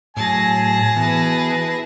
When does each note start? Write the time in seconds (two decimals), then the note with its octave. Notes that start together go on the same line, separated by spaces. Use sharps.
0.17 A2 F#3 G#4 G#5 A5 A#6
0.97 E3 B3 E4 F#4 G#4 B4